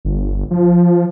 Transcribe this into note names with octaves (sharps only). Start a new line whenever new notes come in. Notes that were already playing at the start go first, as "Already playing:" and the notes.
G1
F3